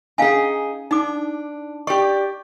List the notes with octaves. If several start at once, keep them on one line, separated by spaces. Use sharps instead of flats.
C#4 D#4 G#4 F5 G#5
D4 D#4 D6
G4 D5 C#6